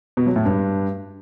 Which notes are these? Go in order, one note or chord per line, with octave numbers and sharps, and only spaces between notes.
B2
F#3
A2
G2